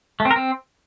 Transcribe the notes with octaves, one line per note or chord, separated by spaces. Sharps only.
A3
C4
A#4
C4